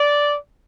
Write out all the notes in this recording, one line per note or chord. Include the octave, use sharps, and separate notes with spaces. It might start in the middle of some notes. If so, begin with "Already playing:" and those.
Already playing: D5